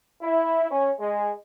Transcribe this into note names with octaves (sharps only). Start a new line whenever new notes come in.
E4
C#4
G#3